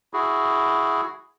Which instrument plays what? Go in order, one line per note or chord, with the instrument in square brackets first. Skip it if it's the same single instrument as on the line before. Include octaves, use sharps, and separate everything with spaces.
[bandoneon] E4 F#4 G#4